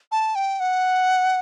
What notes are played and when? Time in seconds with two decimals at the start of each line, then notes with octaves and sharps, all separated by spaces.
0.12 A5
0.35 G5
0.60 F#5